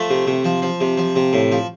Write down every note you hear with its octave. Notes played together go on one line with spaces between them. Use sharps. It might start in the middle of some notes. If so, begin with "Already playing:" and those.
Already playing: F3 A3
C3
C3
F3
F3
C3
F3
C3
A2
F3